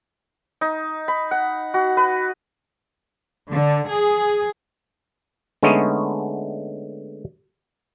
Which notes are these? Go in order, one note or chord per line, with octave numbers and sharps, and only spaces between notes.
D#4
B5
F#5
F#4
B4
D3
G#4
D3 G#3 A3 B3 C#4 D#4